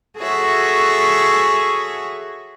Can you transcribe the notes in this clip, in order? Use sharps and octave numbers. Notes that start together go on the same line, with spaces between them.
F#4 G#4 A4 C#5 E5